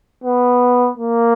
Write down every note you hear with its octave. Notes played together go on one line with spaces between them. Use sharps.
B3
A#3